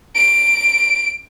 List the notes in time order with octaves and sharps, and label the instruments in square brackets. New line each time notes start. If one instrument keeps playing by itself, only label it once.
[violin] D7